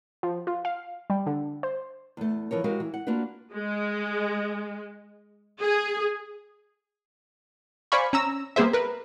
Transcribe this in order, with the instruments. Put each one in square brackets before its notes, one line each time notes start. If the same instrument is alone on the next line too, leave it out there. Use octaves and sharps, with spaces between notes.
[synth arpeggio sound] F3
F4
F5
G3
D3
C5
[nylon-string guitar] E2 A3
E3 F3 A#4 C#5
G#3 F#4 G4 A#4 F5
E3
F#5
A#3 D4 F4 F#4 B4
[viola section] G#3
G#4
[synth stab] C5 D5 F5 G#5 B5 C#6
C#4 A#5 E6
G3 A#3 B3 G#4 C5 E5
A#4 B4